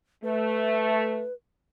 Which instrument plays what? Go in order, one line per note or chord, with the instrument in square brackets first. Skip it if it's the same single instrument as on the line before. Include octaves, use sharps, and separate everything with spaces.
[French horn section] A3 [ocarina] B4